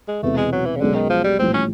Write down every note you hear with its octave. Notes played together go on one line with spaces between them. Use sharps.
G#3
E1 E2 C3 A3
G#3
F#3
E3
C#3
B1 B2 D3 G#3 C#4
D#3
F3
G3
A#1 A2 E3 G3 C4
C#4